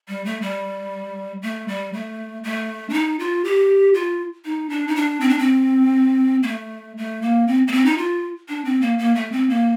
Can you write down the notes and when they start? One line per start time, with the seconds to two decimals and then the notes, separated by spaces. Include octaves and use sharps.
0.08 G3
0.25 A3
0.42 G3
1.43 A3
1.68 G3
1.93 A3
2.44 A3
2.90 D4
2.93 D#4
3.20 F4
3.45 G4
3.94 F4
4.45 D#4
4.70 D4
4.88 D#4
4.96 D4
5.21 C4
5.29 D4
5.39 C4
6.43 A#3
6.47 A3
6.98 A3
7.22 A#3
7.48 C4
7.68 A#3
7.72 C4
7.86 D#4
7.98 F4
8.49 D4
8.65 C4
8.82 A#3
8.98 A#3
9.15 A3
9.32 C4
9.50 A#3